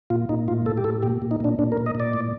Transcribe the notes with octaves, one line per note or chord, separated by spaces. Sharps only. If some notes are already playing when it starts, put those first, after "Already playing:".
A#2 F4
A#2 D#4
A2 F4
A2 A4
G4
A2 A4
A#2 G4
A#2
D#4
A#2 D4
A#2 D4
A#4
A#2
D#5
A#2 D5
A2